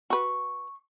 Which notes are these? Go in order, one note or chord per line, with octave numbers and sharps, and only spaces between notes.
F#4 B4 C#6